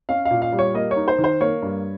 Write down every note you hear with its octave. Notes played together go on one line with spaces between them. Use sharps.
C#4 F5
A#2 F5
F5
G3
C#5
A#3 D#5
C#5
D#4
C5
D#3
C5
A#3 C#5
G2